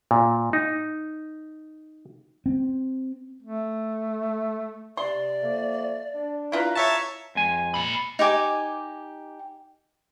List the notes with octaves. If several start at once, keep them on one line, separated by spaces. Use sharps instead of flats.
A#2
D#4
C4
A3
C3 D5 C6
F3 A3 A#3
D4
E4 F4 B4 A#5
C#3 C#5 E5 A5 C#6
F2 G#3 G#5
A#2 B5
D#4 G4 G#5 D6